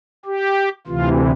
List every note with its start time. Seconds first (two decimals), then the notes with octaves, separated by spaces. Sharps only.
0.25 G4
0.87 D2 C3 E3 F4